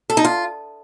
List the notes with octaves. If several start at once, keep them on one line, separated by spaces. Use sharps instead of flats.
A4
D#4
F4